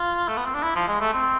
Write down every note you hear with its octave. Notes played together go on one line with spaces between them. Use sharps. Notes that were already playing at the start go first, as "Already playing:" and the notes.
Already playing: F4
A3
B3
C4
D4
E4
F3
G#3
A3
C4